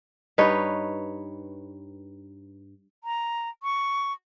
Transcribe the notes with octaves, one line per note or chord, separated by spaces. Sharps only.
G2 D#4 B4 C#5
A#5
C#6